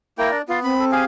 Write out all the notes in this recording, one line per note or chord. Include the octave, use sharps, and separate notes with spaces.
A#3 E4 A#4 G5
D4 D5
B3 F4
C4 B5
A4
G4 G#4 F5 G#5